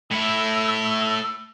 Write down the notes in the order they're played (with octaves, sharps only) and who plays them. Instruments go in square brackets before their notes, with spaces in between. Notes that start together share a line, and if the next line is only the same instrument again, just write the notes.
[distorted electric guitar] A2 E4 [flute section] E6